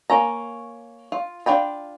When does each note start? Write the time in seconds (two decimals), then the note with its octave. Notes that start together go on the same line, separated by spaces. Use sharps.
0.10 A#3 C#4 A#5
1.12 F4
1.46 D4 F4 G5 B5